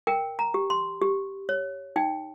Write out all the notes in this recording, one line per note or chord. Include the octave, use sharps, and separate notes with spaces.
A#4 G5
A#5
G4
C6
G4
C#5
D#4 G5